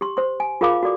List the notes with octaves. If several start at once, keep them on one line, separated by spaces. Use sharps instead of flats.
G4 C6
C5 C6
G#5
F4 G#4 A#4 F5 B5 D6
F#4 A4 D5 D6